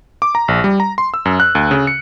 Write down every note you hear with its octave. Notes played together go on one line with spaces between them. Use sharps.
D6
A#5
A#1
G3
A#5
C6
E6
F#2
F#6
D2
C#3
C#7